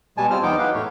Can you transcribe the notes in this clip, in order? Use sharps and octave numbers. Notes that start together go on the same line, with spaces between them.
B2 G3 G#3 G#5 A5
G3 C4 F4 C5 F6
E2 F#3 B3 D#4 G5 D6
B4 F5
A2 A3 C#5